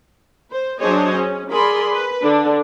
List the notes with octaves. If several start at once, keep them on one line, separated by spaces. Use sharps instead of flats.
C5
F#3 D4 G#4 C5 C#5 D#5
C#4
G#4 A#4 D5 B5 C6
B4
D3 D4